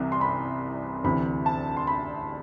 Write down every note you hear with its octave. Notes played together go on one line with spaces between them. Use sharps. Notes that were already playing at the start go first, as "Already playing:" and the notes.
Already playing: C2 C3 E3
C6
B5
D2 C3 E3 B5
A5
C6
B5